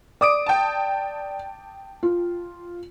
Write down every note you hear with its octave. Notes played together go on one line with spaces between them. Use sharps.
D5 D6 D#6 D7
G5 A5
F4